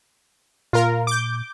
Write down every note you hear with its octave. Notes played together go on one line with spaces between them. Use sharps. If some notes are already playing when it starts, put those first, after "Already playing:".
A#2 F4 A#4
D6 G6